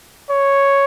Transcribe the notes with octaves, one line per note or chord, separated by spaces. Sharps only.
C#5